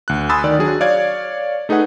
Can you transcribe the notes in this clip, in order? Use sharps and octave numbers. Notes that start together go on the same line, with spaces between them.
D2 F#6
G#5 B5 C6 D#6 E6 A6
D#3 D5
F#3 D4 G#4
C#5 D5 F5 G#6
A3 D#4 G#4 B4 F#5